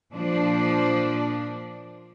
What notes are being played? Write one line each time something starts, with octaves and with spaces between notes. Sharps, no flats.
A#2 F3 D4